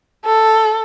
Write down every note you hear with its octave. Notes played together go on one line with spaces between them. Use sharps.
A4